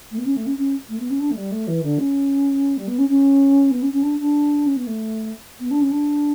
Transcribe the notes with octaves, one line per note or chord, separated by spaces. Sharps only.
A3
B3
C#4
A3
C#4
C#4
A3
B3
C#4
D4
A3
G3
A3
E3
D3
C#4
G3
B3
C#4
C#4
B3
C#4
C#4
D4
D4
C#4
B3
A3
B3
D4
C#4
D4